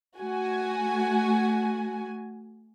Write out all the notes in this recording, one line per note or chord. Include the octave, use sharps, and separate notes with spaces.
A3 F#4 G#5